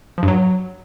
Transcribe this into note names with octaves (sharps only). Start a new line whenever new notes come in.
F3
G2
F#3